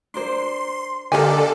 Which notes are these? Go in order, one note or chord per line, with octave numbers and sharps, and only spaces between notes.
D4 A#4 C5 C6
D3 G4 A4 A#4 D5 D#5 F5 G#5